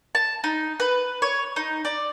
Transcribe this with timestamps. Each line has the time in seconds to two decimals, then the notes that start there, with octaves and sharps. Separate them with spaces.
0.15 A5
0.44 D#4
0.80 B4
1.22 C#5
1.56 D#4
1.85 D5